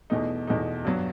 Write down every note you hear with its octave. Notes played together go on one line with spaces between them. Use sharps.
E2 B2 A3 D#4
E2 B2 A3 D#4
G2 F#3 B3